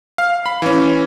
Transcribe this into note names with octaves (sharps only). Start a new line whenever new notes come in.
F5
B5
E3 C#4